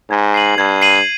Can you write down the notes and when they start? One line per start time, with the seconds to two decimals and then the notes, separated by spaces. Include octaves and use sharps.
0.10 G#2 G#6
0.34 C7 D#7 F#7
0.57 G2 G#6
0.82 C7 D#7 F#7